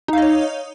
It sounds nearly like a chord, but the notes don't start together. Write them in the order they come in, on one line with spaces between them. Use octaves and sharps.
D#4 F5 D#5 C#5